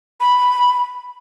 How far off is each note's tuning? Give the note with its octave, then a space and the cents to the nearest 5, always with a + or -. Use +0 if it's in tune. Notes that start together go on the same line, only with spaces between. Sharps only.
B5 +0